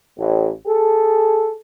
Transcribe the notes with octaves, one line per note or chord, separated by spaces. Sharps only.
A1
G#4 A4